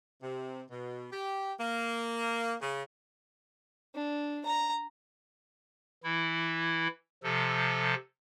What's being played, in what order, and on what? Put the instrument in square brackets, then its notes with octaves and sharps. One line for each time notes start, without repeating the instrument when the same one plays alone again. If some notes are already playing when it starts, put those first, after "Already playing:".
[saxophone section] C3
B2
G4
A#3
C#3
[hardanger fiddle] D4
A#5
[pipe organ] E3 E4
C3 F3 A4